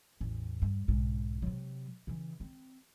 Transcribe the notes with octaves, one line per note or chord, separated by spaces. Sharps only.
A1 E2
G2
B1 G#2
C3 F#3
C#3 E3
C4